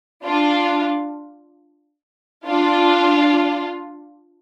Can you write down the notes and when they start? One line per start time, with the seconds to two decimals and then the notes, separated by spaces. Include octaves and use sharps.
0.24 D4 F4
2.46 D4 F4